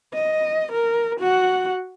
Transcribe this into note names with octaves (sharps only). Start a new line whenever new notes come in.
D#5
A#4
F#4 F#5